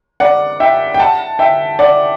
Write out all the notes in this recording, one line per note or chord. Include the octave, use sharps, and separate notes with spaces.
D5 F#5
E5 G5
G5
F#5 A5
E5 G5
D5 F#5